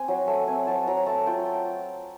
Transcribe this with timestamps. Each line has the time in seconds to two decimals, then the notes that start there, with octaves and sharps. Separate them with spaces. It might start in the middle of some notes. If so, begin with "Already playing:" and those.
Already playing: C4 G#5
0.08 F#3
0.28 A3
0.48 C4 G#5
0.67 F#3 A5
0.87 F#3 A#5
1.06 A3 A5
1.26 F4 G5